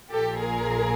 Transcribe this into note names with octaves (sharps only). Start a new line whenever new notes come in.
A#1 A#2 F3 G4 A4
G#4 A#4